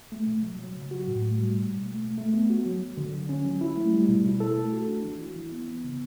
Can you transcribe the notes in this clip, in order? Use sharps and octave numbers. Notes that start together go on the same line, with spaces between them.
A3
B2
F#3
F#3
C#3
F#4
A2
A3
G3
B2
B2
A3
A3
A3
B3
F#4
F#3
F#3
D3
D3
C#4
F#3
E4
A3
G3
B2
E4
A4
A3
F#4
D4
E3
E4
E3
B3
B3
C#3